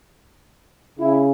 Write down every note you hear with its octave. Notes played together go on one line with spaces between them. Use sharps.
C#3 E4